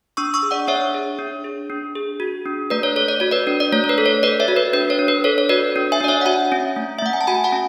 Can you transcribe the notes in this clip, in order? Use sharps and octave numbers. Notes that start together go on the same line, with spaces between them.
D4 C#6 E6
C#6 E6
G#4
D5 F#5
D4 C#5 E5
G#4
D4
G#4
D4
G#4
F#4
D4
A3 B4 D5
C#5
A4 C#5
D5
F#4 C#5
B4 D5
D4
D5
A3 C#5
C#5
B4
A4
C#5
A4 B4 D5
C#5 E5
F#4
B4
D4 B4
C#5
D4
B4
A4 C#5
C#5
F#4 B4 D5
D4
E5 G#5
D4 D5
C#5 E5
F#5
F#4 E5 G#5
C#4
A3
E5
A3 F#5
G#5
A5
F#4 G#5 B5
F#5 A5
C#4